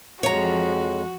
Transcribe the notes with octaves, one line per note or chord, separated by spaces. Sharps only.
F2 E3 F3 G#3 F#4 C#5 A#5